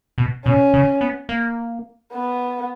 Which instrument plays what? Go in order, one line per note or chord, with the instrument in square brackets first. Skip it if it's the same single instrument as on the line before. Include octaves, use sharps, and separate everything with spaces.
[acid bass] B2
[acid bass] B2 [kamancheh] C#4
[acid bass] C#3
B3
A#3
[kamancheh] B3